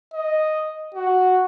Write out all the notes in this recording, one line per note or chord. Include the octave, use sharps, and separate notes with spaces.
D#5
F#4